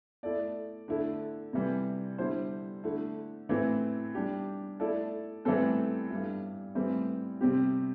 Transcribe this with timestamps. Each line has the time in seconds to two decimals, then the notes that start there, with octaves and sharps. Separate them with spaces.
0.23 A3 E4 A4 D5
0.88 D3 A3 E4 A4
1.53 C3 E3 G3
2.18 D3 G3 E4 C5
2.84 D3 A3 E4
3.49 A2 E3 C4 E4
4.15 G3 D4 G4
4.80 A3 E4 A4 D5
5.45 A2 E3 G3 C4 A4
6.10 G2 G3 E4
6.75 A2 E3 G3 C4
7.41 C3 G3 C4 G4